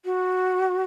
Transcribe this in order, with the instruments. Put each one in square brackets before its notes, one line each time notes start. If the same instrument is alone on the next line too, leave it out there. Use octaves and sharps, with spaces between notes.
[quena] F#4